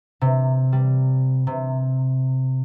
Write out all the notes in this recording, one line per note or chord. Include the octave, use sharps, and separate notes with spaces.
C3
G3
C3